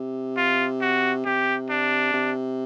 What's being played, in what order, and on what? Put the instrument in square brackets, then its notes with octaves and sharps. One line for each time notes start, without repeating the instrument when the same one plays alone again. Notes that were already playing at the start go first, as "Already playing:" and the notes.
Already playing: [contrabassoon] C3
[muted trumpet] F4
F#4
[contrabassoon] C3 [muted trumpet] G4
[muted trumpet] D4
[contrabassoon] C3